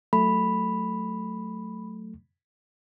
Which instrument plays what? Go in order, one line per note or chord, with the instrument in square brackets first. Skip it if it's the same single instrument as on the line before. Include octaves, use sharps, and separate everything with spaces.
[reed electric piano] F#3 A3 [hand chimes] B5